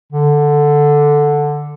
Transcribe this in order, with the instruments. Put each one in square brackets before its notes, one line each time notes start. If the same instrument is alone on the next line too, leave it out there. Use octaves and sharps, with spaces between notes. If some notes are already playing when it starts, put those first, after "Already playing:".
[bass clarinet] D3